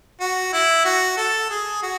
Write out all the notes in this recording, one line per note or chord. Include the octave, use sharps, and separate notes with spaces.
F#4
E4
F#4
A4
G#4
F#4